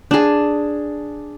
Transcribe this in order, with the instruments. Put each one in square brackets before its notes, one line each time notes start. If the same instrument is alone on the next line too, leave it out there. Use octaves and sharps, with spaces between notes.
[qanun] D4 G#4